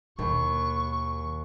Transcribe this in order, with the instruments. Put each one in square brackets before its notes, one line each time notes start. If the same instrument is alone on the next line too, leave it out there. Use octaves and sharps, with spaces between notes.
[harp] D#2 [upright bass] B2 D#3 [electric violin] C#6